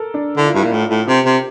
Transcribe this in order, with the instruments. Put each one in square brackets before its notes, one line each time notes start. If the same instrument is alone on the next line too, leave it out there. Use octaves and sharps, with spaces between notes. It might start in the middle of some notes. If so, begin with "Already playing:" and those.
Already playing: [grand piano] A4 A#4
D4
[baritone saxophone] D3 [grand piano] E4
[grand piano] F4
[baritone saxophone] G2 [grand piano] E4
[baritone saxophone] A#2
[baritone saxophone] A2 [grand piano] F4
[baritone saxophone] A2
[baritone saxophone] C3 [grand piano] G4
[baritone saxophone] C3